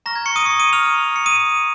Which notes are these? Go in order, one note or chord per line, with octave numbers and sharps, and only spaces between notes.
A#5 C#6 F6 A#6
G#6
C#6 C#7
D#6 D#7
C#6 C#7
D#6 D#7
F6 F7
A#5 C#6 F6
C#7
D#6 D#7